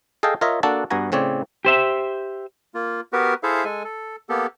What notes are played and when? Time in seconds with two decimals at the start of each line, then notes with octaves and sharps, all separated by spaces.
0.23 G#4 A4 D#5 F5 G5 A5
0.41 F4 A#4 C#5 D#5 E5
0.63 A#3 D4 F#4 A4 F#5 A5
0.90 G2 B3 F#4 G#5 A#5
1.12 A2 C#3 C4 C#5 D5
1.65 G4 C5 E5
2.74 A#3 F4
3.13 B3 F#4 G4 A#4 B4
3.43 E4 G#4 A4 C5 E5 F5
3.64 G#3 A4 G#5
3.84 A4
4.29 A#3 B3 G4 A4